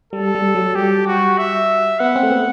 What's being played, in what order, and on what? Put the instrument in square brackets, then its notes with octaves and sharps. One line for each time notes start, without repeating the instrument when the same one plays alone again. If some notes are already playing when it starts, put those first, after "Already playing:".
[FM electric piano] G3 [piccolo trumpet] A4
[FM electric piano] G3
F#3
[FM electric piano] G3 [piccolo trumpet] G4
[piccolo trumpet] F#4
E5
[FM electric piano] B3 [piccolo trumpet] F#5
[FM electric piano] C4
A3
B3